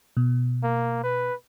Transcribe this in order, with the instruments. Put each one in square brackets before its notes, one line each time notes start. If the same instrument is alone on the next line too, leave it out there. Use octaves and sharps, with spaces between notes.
[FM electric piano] B2
[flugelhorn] A#3
B4